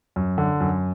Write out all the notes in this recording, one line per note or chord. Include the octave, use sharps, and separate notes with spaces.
F#2
D3
F#2